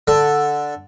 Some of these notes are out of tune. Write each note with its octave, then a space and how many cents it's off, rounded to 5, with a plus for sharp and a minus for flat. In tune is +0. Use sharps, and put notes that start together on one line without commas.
D3 +0 A4 +0